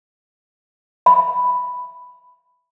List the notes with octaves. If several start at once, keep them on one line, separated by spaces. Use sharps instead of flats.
E5 B5